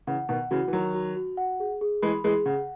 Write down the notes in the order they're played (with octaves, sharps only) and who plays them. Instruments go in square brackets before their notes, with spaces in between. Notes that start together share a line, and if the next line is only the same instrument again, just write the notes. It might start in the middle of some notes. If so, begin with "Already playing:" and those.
[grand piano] C#3 E3 [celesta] F#5
[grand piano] B2 D#3 [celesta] F#5
[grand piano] C#3 E3 [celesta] F#4
[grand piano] E3
[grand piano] D#3 F#3 [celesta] F#4
[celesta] F#4
F#4
F#5
G#4
G#4
[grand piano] E3 G#3 [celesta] B5
[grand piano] E3 G#3 [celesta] G#4
[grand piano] C#3 [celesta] F#5